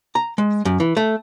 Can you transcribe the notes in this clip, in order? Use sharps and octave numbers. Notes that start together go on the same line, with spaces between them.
A#5
G#3
F#2
E3
A3